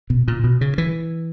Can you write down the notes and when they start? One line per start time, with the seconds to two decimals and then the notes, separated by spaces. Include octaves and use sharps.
0.10 B2
0.28 A#2
0.44 B2
0.61 C#3
0.78 E3